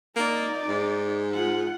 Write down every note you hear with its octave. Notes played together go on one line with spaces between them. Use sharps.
A#3 D#4 D5
G#2
F4 F#5